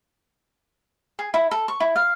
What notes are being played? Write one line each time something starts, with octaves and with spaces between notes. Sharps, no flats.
G#4
E4
A4
C#6
E4
F5